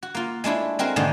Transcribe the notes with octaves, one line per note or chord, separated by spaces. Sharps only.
F#4
A#3 F4
G#3 A3 D4 E4
G#3 C4 F#4 A#4
G#2 B2 D3 D#3 A3 A#3